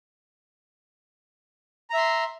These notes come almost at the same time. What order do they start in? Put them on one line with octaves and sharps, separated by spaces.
A#5 E5 C6